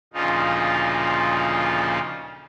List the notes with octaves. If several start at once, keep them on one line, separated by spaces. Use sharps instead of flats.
D2 A#2 C#3 F3 D#4 F4